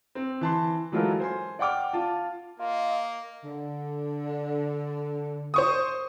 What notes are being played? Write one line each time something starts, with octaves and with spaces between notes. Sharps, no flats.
C4
E3 A5 C6
E3 F#3 G#3 F4 A4 A#4
C5 G#5 C6
D5 F#5 G5 D6 F6
F4 A5
A#3 F4 D#5
D3
C5 C#6 D#6